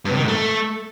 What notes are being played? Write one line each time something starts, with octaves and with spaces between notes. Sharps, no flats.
G2
C3
D#3
G#2
A3